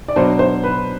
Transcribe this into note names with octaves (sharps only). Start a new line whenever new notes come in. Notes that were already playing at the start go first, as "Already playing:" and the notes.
D5
B2 F#3 B3 D4 C5
C5
B4